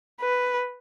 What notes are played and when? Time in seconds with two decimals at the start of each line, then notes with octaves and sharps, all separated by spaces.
0.21 B4